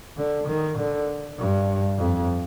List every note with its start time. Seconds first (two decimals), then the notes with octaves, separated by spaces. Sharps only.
0.17 D3
0.48 D#3
0.78 D3
1.38 G2
1.99 F2